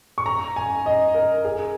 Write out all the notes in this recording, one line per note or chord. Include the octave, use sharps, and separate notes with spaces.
C#6
A#5
G#5
D#5
A#4
G#4